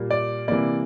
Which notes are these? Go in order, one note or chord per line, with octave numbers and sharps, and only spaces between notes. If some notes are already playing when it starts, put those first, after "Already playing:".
Already playing: A#2 G3 A#3
D5
C3 E3 G3 A#3 D5